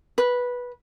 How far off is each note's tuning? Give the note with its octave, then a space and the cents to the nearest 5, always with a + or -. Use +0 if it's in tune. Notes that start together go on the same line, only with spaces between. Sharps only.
B4 -10